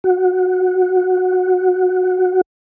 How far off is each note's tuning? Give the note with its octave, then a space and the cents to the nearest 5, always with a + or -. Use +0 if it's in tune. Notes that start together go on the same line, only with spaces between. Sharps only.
F#4 -10